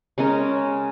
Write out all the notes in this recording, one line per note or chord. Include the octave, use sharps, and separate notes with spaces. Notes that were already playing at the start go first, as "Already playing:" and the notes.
C#3 G#3 C#4 A#4